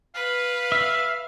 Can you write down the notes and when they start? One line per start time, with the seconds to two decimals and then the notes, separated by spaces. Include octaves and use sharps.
0.15 B4 F5
0.72 E5